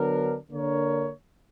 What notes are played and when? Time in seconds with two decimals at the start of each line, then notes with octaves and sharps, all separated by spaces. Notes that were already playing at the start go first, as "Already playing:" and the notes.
Already playing: D3 F#3 B3 D4 A#4
0.50 D3 A#3 D4 A#4 C#5